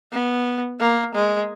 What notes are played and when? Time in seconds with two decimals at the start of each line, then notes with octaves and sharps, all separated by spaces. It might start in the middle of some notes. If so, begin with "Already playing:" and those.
0.12 B3
0.80 A#3
1.15 G#3